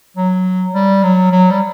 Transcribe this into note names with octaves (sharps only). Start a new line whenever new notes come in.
F#3
G3
F#3
F#3
G3